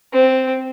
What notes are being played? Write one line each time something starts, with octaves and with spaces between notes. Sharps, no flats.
C4